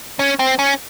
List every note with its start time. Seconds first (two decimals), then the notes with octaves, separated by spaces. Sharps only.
0.19 C#4
0.39 C4
0.59 C#4